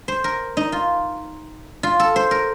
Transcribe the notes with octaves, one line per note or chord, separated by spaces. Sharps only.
C5
A#4
D#4
F4
F4
A4
C5
A#4